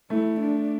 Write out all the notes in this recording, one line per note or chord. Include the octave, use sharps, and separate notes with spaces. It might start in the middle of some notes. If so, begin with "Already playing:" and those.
A3 E4
D4